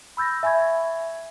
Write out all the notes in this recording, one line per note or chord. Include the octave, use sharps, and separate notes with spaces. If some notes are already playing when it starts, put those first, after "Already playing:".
B5 E6 G6 A6 A#6
E5 G#5 B5 C#6 G#6